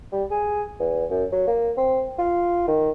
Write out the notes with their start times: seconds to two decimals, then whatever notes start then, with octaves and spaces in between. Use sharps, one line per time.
0.12 G3
0.31 G#4
0.80 E2
1.10 F#2
1.32 F#3
1.47 A#3
1.77 C4
2.19 F4
2.67 D#3